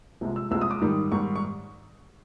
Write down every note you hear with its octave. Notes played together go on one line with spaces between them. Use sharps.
C2 C3 F3 G#3
E6
C2 C3 F3 G#3 E6
D#6
D6
G#2 D#3 G3
G#2 D#3 G3 C#6
C#6